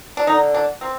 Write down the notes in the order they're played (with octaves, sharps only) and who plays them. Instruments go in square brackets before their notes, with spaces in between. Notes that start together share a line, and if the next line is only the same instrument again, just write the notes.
[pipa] D4
[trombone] D3 [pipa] D#4
[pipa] D4
C4